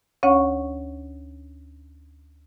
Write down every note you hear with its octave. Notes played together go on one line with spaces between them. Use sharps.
D2 C#4 C#5 F#5 C#6